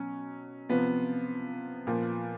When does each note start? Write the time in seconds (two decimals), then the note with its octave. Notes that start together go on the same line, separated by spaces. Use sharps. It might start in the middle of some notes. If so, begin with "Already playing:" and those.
Already playing: B2 F#3 C#4
0.69 C3 F3 B3
1.87 A#2 F3